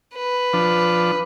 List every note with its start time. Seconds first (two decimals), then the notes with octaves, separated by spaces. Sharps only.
0.16 B4
0.53 F3 D4